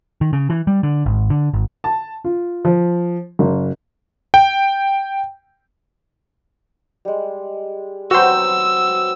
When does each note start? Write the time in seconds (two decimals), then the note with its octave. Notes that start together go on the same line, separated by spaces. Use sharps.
0.21 D#3
0.33 C#3
0.50 E3
0.67 G3
0.83 D3
1.06 G#1
1.30 D3
1.53 G#1
1.84 A5
2.24 F4
2.65 F3
3.39 F#1
4.34 G5
7.05 G3 G#3
8.11 F#3 B3 C4 F#4 C5 E6